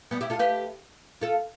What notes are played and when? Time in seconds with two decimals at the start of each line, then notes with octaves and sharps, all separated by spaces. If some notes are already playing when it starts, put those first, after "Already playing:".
0.11 G3 B3
0.21 E4 G4
0.30 F4 A4
0.39 G4 B4
1.21 F4 A4